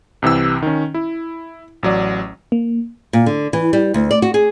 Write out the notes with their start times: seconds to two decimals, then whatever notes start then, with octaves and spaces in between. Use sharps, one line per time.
0.22 C2 C3 E3 E6
0.62 D#3 C#4
0.94 E4
1.83 A1 F#3 D5
2.52 A#3
3.13 A#2
3.26 D3
3.53 E3
3.73 G3
3.94 D2
4.11 D5
4.22 F#4
4.34 G#4